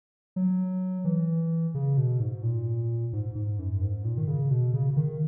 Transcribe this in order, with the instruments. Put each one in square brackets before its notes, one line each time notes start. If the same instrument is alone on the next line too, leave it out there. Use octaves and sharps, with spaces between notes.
[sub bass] F#3
E3
C#3
B2
G#2
A#2
G#2
G#2
F#2
G#2
A#2
D#3
C#3
B2
C#3
C#3
D#3